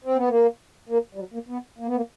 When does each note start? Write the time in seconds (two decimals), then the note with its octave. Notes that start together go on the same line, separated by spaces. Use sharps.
0.04 C4
0.16 B3
0.29 A#3
0.89 A#3
1.15 G3
1.19 F#3
1.34 A#3
1.49 B3
1.78 A#3
1.88 B3
1.96 A#3